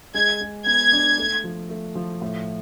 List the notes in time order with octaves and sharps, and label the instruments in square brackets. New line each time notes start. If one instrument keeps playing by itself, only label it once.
[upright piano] G#3 [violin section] G#6
[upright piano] G#3
[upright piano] B3 [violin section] G#6
[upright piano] D4
A3
F3
A3
F3
A2